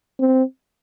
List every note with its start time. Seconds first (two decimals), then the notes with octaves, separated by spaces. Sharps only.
0.20 C4